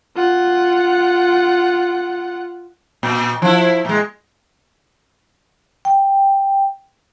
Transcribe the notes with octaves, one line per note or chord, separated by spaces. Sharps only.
F4 F#5
A#2
F3 E4
A#2 G#3
G5